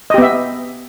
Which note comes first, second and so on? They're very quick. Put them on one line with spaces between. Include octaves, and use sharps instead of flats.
D#5 G4 B3 E5